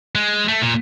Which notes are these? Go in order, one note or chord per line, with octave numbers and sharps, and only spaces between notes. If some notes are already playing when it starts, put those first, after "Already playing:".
G#3
A3
A#2